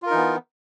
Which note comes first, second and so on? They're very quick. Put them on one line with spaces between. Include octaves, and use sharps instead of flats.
F4 A#4 D#4 E3 B3